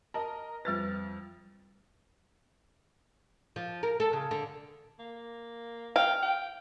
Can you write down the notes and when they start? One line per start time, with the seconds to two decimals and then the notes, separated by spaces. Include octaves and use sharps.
0.14 A#4 D#5 A5
0.65 F2 G3 B4 F6 A6
3.56 F3
3.83 A#4
4.00 A4
4.13 C#3
4.31 D3
4.99 A#3
5.96 F5 G5
6.22 G5